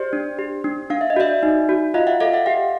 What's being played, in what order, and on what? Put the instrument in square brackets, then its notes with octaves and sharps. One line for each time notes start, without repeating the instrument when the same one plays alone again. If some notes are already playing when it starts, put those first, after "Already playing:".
Already playing: [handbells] G4 C5 D5
D4
G4
D4
D4 F5
E5
D#5
F#4 D5 E5
D#4
F#4
F4 D#5 F5
E5 F#5
A4 D#5 F5
E5 F#5
G4 F5 G5